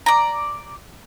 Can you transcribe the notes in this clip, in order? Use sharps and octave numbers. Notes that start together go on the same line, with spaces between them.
D5 A#5